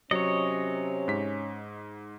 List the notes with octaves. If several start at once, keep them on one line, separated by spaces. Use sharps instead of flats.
C3 F#3 C#4 C#5 D#5 C#7
G#2 B6